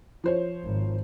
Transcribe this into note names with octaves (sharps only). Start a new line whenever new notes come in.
F3 C5 C#5
G#1